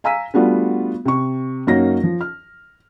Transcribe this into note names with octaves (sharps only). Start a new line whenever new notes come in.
F5 G#5 A#5 E6 B6 D#7
G3 A3 B3 D4 F4 F#4
C3 C#6
F#2 A#3 C#4 D#4 F#4 A#6
F3
F6